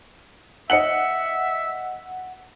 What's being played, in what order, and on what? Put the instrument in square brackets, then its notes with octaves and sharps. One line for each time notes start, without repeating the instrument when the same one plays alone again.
[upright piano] D#5 C#7 F#7 [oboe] E5 [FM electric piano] F#5